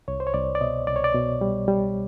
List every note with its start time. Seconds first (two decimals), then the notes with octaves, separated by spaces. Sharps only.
0.08 C2 C#5
0.20 C5
0.27 C#5
0.34 C2 D5
0.55 D5
0.61 B2 D#5
0.87 C2 D5
0.96 C#5
1.04 D5
1.15 B2
1.41 G3
1.68 G3